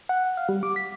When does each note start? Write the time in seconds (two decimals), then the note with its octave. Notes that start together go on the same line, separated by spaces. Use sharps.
0.09 F#5
0.37 F5
0.49 G3
0.63 D6
0.76 B6